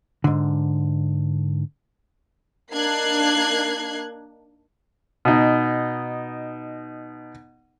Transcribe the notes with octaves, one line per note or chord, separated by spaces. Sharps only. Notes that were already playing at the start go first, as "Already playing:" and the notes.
G#2 D3
A#3 D4 D#4 F#6 G#6 C7
B2 D#4